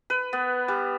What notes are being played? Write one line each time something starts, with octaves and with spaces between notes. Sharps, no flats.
B4
B3
G3